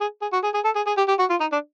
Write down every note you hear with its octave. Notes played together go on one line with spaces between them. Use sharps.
G#4
G#4
F#4
G#4
G#4
A4
G#4
G#4
G4
G4
F#4
F4
D#4
D4